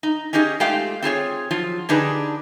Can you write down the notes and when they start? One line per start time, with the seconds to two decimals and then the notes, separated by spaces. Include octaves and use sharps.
0.03 D#4
0.33 C#4 D#4 G4 G#4 D#5
0.60 G#3 A3 F4 G4 F5 G5
1.02 C4 F4 G#4 C#5
1.51 F3 F#3 F4
1.89 D3 D4 D#4 G4 G#4 B4